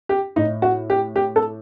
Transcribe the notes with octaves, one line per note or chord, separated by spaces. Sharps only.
G4
A2 D#4
F#4
G4
G4
A4